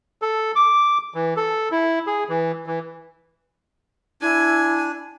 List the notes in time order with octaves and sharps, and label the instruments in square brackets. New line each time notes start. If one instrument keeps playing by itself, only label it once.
[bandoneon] A4
D6
E3
A4
E4
G#4
E3
E3
[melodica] D4 [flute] E4 [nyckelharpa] G#5